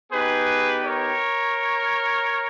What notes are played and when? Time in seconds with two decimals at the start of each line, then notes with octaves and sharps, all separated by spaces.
0.11 B3 D#4 G4 G#4 B4
0.84 A#4 C#5